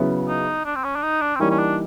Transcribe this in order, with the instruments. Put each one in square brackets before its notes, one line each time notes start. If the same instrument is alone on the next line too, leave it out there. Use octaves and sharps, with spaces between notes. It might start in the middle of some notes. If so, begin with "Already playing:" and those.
Already playing: [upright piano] C#3 F#3 B3 E4
[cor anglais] D#4
D4
C4
C#4
D4
D#4
D4
C4
[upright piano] E3 G3 A#3 D#4 [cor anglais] C#4
[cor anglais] C#4
D4